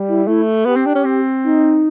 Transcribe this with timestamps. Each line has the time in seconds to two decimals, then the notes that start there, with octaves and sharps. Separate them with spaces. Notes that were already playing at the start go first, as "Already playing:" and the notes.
Already playing: G3
0.08 E4
0.28 A3 E4
0.66 B3 G4
0.76 C4
0.86 D4
0.96 C#4
1.05 C4
1.44 D#4